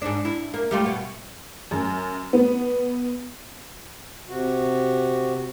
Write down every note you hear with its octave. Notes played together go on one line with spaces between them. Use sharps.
G#2 D4
E4
A#3
G3 A3 F4
B2
F#2
B3
C3 F#4